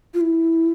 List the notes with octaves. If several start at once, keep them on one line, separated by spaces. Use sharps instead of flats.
F4
E4